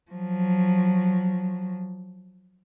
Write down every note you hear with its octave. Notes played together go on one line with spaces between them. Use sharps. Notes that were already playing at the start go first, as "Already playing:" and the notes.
F3 F#3